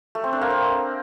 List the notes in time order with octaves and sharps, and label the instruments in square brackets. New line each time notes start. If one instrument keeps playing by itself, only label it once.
[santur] A3
C4
D4
A#3
C4